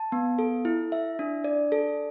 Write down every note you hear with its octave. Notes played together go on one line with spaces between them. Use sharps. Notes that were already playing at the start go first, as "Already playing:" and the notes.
Already playing: A5
B3
A4
E4
E5
D4
D5
A4